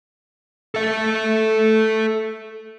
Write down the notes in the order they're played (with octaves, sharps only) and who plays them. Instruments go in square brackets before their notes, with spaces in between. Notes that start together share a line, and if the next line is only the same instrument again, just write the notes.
[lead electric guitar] A4 E5